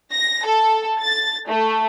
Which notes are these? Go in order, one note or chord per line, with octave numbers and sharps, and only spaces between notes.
A#6
A4
A6
A3